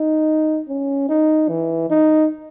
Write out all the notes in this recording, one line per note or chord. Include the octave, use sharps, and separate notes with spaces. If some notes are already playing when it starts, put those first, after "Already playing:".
Already playing: D#4
C#4
D#4
E3
D#4